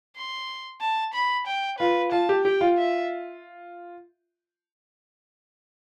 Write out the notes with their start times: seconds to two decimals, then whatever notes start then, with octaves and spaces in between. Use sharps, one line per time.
0.16 C6
0.81 A5
1.14 B5
1.47 G5
1.79 F4 B4
2.12 F4 A5
2.29 G4
2.45 G4 G5
2.61 F4
2.78 E5